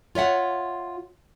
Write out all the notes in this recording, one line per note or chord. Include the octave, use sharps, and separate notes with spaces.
F4 C#5 E5 F#5